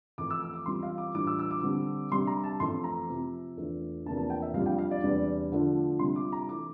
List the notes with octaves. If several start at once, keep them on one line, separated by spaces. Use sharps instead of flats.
F2 E3 A3 D6
E6
E6
D6
E3 G3 C4 F4 C6
F5
D6
A2 E3 G3 D4 F4 D6
E6
E6
D6
D3 G3 C4
C3 G3 D4 C6
A#5
A5
F2 E3 A3 C4 C6
A#5
C3 F3 C4
E2 E3 A3 D4 F4
E2 C3 F3 A#3 D4 A5
A5
G5
E5
F2 C3 G3 D4 F4 F5
G5
F5
D5
E2 C3 G3 D4
D3 F3 A3 D4 F4
C3 G3 D4 F4 C6
D6
A#5
E3 A3 E4 D6